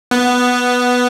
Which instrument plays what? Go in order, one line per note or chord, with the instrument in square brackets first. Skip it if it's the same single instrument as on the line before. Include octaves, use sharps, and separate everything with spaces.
[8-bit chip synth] B3